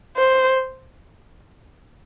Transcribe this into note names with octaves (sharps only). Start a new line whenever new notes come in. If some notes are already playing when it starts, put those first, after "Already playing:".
C5